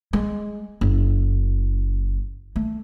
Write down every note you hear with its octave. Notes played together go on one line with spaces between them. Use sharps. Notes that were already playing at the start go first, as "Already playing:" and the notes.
G#3
F#1
A3